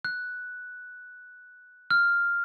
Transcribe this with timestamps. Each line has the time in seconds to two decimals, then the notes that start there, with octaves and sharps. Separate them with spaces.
0.05 F#6
1.91 F6